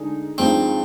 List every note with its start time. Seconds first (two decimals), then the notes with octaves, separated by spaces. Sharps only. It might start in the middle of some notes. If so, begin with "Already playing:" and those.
Already playing: D3 G#3 D#4 G#4
0.38 G2 F3 G#3 C4 D#4